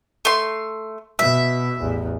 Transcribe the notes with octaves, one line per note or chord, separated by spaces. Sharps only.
A3 C6
B2 E5
A1 E2